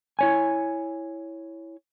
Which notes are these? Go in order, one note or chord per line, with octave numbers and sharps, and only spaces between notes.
E4 C#5 G#5